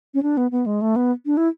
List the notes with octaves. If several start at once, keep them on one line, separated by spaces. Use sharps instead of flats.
C#4
D4
B3
B3
G#3
A3
B3
D4
E4